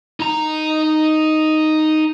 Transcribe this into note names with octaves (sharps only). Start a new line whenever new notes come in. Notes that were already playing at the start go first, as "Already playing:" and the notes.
D#4 A#5